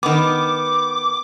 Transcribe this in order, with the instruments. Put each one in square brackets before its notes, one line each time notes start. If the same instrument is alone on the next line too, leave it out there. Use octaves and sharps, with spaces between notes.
[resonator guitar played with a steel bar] D#3 B3 [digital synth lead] D6